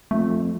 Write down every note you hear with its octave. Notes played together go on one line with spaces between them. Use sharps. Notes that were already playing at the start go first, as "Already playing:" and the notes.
F2 A3